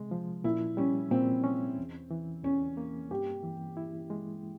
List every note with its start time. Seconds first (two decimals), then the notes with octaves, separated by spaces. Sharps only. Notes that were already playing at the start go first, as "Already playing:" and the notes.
Already playing: C3 G#3
0.11 F3
0.44 A#2 E4
0.77 G3 C#4
1.11 A#2 C4
1.44 C#4
1.78 E2
2.11 E3
2.44 E2 C#4
2.77 A#3
3.11 G2 G4
3.43 E3
3.77 E4
4.10 G#3